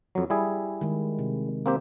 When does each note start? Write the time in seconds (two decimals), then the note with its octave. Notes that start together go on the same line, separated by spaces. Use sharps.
0.15 F2 F#3
0.30 G3 E4 G#4
0.81 D#3 G#3
1.19 C3
1.66 A#3 C4 G4